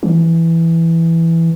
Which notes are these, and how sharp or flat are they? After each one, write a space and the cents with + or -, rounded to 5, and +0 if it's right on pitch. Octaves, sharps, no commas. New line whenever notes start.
E3 +5